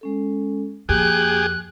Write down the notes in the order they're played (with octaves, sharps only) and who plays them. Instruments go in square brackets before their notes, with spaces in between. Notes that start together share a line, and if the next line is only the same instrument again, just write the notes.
[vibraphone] G#3 C#4 A4
[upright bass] F2 [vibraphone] A#3 [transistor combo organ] G4 G#4 [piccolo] F#6